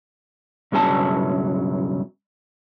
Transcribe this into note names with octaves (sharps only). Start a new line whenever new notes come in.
B1 G2 C#3 F#3 G#5 A5